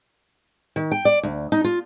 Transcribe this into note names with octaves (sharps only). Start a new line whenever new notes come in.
D#3
G5
D5
D2
D#4
F4